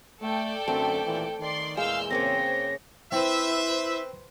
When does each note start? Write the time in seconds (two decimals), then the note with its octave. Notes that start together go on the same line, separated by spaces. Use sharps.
0.22 A3 A4 D5 G5
0.68 F#2 D3 A3 C4
1.06 D#2 A#2 E3
1.39 D#3 D5 C6
1.77 E2 A#2 G#3 F5 E6 F6 G6
2.11 C#3 A#3 C4 C5 C#5 G5 A#6
3.12 C4 E4 B4 C5 E5